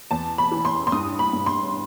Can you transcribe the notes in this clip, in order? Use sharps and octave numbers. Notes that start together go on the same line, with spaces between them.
E2 A5
B5
E3
C6
C6
G2 D#6
B5
G2
C6